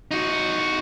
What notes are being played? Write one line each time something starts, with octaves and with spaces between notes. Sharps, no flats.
D#4 F#4